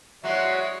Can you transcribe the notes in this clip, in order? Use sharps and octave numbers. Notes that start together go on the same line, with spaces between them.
F#3 G#3 F#4 C#5 D5 E5